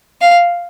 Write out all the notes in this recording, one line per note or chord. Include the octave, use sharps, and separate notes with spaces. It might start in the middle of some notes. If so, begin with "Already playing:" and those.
F5